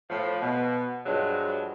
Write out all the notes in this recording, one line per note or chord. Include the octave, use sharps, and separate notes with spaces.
A2 F3
B2
G2 F3 F#3 G#3